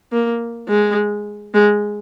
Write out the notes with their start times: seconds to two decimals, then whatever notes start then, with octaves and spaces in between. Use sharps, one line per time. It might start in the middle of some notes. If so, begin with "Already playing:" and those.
0.12 A#3
0.68 G#3
1.54 G#3